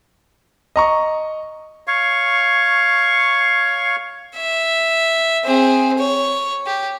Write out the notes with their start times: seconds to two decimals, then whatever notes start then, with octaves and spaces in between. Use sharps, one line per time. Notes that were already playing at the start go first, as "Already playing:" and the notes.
0.76 D#5 A#5 C#6
1.87 C#5 F5 C#6
4.36 E5
5.44 C4 G#4
5.98 C#5
6.66 G4